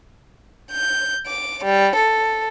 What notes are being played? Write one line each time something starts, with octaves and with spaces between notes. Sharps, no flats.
G6
D6
G3
A4